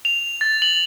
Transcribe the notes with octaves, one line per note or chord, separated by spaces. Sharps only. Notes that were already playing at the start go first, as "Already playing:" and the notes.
F7
A6
F#7